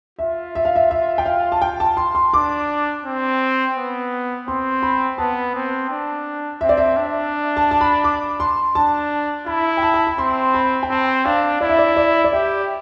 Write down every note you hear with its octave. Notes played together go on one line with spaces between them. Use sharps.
F4 E5
E5
F5
E5
E5
G5
F5
A5
G5
A5
C6
C6
D4 D6
C4
B3
C4 C6
B5
B3 A5
C4
D4
C4 E5
D5
E5
D4
A5
A5
B5
D6
C6
D4 A5
E4 B5
G5
A5
A5
B5
C4 C6
B5
G5
C4 A5
D4 F5
E4 D5
E5
D5
D5
D5
G4 E5